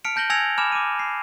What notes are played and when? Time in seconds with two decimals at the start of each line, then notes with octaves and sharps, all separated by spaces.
0.04 A5 F6 B6 C#7 D7 F7
0.16 A5 G6 A#6 F#7 G7
0.30 G#5 E6 G#6 A#6 C#7 F7
0.57 G#5 A5 B5 D6 F6 E7
0.72 D6 D#7
0.99 C7